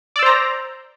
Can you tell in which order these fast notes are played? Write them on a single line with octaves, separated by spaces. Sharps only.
D5 E6 C5 A#5